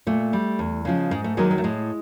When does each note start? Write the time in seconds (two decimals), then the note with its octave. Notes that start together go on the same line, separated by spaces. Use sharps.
0.07 A#2 A3
0.33 G3
0.59 E2
0.85 C#3 F3 G#3
1.11 G#2 G#3
1.24 A3
1.37 D#3 F#3 G#3 A#3
1.51 G#3
1.58 A3
1.64 A2 G#3